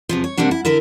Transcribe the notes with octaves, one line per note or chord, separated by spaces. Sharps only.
E2 C3 F3
C#5
C3 G3 A#3 D4 F#5
E4
D3 E4 A#4 E5